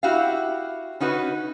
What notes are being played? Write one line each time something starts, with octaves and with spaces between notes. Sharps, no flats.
E4 F#4 G4 E5 F5
C#4 D#4 F#4 B4